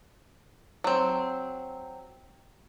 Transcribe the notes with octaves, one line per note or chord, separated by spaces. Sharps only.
F#3 C4